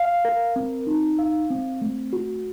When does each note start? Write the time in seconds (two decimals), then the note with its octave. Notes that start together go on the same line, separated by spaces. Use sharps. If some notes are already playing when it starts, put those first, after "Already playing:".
Already playing: F5
0.25 A#4
0.56 C4
0.87 D#4
1.19 F5
1.50 C4
1.81 A3
2.13 F#4